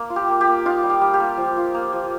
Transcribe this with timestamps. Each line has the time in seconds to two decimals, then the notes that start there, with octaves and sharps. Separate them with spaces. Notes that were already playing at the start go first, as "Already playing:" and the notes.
Already playing: A#3
0.10 F4
0.16 G4
0.29 A#3
0.41 G4
0.47 A#3
0.65 D#4 F4
0.83 G3
0.90 G4
1.01 G3
1.14 G4
1.20 A#3
1.37 F3
1.57 F4
1.74 A#3
1.93 F3